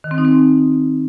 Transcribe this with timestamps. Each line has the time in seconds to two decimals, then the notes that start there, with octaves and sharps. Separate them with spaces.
0.04 D#3
0.11 C4
0.18 D#4
0.25 C4